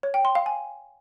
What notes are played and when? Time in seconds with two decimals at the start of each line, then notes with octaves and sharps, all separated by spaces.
0.03 C#5
0.14 G5
0.25 C6
0.35 F5
0.46 G#5